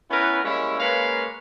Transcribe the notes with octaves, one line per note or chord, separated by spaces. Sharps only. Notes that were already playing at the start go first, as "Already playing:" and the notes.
B3 C#4 E4 A#4 B4
G3 G#3 A#3 C#4 E4
G#3 A#3 C#4 B4 C#5 F5